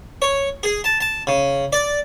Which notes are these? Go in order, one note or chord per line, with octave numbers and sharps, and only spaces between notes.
C#5
G#4
A5
A5
C#3
D5